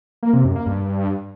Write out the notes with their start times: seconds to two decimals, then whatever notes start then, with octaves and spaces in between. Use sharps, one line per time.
0.23 A#3
0.34 C3
0.44 F#2
0.55 A#3
0.66 G2